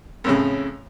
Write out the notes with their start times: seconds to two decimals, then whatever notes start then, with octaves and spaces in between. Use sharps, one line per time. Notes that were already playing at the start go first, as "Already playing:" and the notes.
0.24 F2 A2 C#3